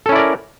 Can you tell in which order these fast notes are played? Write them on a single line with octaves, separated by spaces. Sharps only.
A4 C#4 E4 D5 A#4